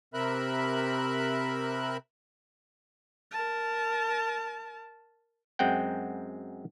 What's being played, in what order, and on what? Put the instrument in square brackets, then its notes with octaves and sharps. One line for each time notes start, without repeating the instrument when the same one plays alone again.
[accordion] C3 C4 A#4 E5 B5 F#6
[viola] A#4 A5
[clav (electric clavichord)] F#2 G#3 C4 F#5 G5